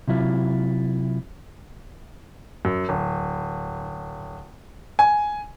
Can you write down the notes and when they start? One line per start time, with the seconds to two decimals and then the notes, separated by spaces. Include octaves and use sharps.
0.08 C3 F#3 E4 F4
2.65 F#2
2.89 D1
4.99 G#5